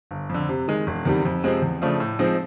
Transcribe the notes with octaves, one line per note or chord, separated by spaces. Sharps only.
G1
F2 D3
C3
D#3 G#3
E1
E2 C3 D#3 G3
F2
C3 F3 G#3 C4
E2
C#3 F3 A3 D4
A2
F3 G#3 C4 D#4